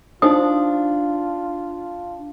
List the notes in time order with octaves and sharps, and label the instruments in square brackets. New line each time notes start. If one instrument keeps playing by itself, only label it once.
[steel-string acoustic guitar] D4 [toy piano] D#4 C5 D#6 [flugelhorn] F4